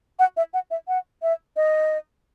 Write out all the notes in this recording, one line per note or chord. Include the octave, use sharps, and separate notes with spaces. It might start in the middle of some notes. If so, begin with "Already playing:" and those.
F#5
E5
F#5
E5
F#5
E5
D#5